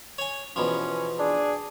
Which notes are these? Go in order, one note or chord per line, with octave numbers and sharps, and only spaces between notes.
C#5 G#5
E2 B2 F3 C#4
D4 G#4